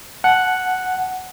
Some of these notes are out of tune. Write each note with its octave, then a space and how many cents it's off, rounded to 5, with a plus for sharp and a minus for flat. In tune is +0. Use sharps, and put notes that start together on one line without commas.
F#5 +0 A5 -30